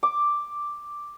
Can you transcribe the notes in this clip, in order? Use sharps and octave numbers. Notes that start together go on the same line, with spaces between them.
D6